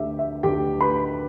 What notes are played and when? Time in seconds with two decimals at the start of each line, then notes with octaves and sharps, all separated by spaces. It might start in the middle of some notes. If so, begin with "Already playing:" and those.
Already playing: D2 D3 G4 E5
0.19 E5
0.43 D2 D3 G4 G5
0.81 B4 B5